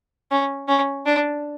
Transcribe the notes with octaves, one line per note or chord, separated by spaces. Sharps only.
C#4
C#4
D4